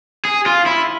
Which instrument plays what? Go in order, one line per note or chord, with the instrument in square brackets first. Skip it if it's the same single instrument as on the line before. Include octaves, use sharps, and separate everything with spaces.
[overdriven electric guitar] G#4
F4
E4